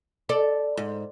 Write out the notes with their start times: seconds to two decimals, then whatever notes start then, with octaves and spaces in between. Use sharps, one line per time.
0.29 A4 D5
0.77 G#2